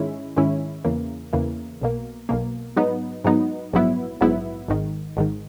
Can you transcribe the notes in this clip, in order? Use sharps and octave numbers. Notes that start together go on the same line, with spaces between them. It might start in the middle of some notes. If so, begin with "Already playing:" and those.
Already playing: G#2 D#3 G#3 C#4 E4
G#2 D#3 G#3 C#4 E4
E2 C#3 E3 A#3
E2 C#3 E3 A#3
B1 B2 A#3
B1 B2 A#3
G#2 F#3 B3 D#4
G#2 F#3 B3 D#4
A#1 G#2 F#3 B3 E4
A#1 G#2 F#3 B3 E4
G#1 G#2 D#3
G#1 G#2 D#3